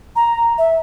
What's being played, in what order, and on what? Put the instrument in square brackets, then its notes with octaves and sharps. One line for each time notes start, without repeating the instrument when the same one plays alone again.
[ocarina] A#5
E5